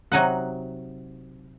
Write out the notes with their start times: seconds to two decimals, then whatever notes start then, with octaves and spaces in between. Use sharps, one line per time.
0.12 C3 F#3 D#4 F#5